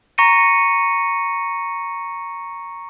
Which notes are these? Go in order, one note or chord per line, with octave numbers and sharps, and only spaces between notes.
A#5 C#6 A#6 C#7 D#7